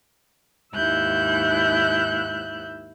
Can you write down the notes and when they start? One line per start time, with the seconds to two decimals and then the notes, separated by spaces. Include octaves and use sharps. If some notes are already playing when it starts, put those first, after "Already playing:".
0.74 D#2 G#2 E4 E6 F#6 G6